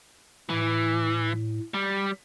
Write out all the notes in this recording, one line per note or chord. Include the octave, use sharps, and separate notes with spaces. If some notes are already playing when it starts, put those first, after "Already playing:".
A2 E3
G3